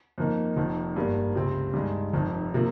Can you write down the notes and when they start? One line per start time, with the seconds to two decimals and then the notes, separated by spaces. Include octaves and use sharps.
0.18 F2 D#3 A#3 D#4
0.56 F1 F2 D#3
0.96 G#1 G2 G3 A#3
1.35 C#2 C3 G3 C4
1.73 G2 D#3 G#3
2.13 F1 F2 D#3
2.54 C3 F3 A#3